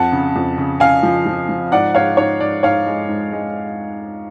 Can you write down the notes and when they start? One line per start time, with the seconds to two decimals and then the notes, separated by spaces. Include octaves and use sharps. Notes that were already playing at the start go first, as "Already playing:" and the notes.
Already playing: F2 F#5 A5
0.12 C#3
0.36 F2
0.58 C#3
0.80 C#3 F5 G#5
1.03 F3
1.26 F3
1.49 F3
1.72 G#2 D5 F#5
1.94 G#2 C#5 F5
2.17 G#2 C#5
2.40 G#2 D5
2.63 G#2 C#5 F5
2.86 G#3
3.09 G#2
3.32 G#3